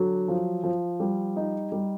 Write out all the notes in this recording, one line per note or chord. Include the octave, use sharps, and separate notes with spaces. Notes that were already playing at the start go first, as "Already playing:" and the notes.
Already playing: D3 F#3
F3
F3
G3
D#4
G3